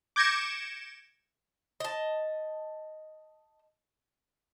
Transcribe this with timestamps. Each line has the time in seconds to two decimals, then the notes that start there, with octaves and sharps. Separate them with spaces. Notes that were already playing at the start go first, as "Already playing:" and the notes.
0.16 D6 G6 G#6 A#6 C#7 E7
1.80 D#5 A5